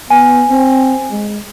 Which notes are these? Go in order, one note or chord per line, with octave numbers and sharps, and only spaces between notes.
B3 G#5
C4
G#3